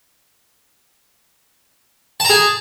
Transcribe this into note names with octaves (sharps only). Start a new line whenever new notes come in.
G#4 A5 A#5